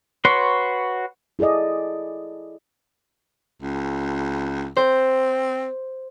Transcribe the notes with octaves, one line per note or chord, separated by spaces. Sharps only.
F#4 B4 C#5 C6
E4 G#4 A4 D5 D#5
C#2
C4 C5